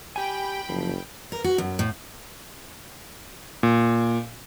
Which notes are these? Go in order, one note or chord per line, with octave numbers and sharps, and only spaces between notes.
G4 G5 G#5 B5
F#1 F3
A#4
F#4
F#2
A2
A#2